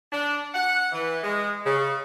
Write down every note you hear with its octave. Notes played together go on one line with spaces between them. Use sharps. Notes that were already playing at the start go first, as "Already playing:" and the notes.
D4
F#5
E3
G#3
C#3